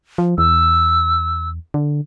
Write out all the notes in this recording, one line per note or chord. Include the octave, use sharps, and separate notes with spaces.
F3
E2 E6
D3